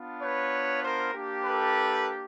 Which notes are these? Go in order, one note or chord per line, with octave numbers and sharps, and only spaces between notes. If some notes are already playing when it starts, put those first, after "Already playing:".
Already playing: B3 D4 F4
B4 C#5
A#4 C5
A#3 D4 G4
A4 B4